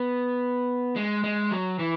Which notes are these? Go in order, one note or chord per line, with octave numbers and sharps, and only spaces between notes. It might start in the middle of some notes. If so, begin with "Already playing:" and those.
Already playing: B3
G#3
G#3
F#3
E3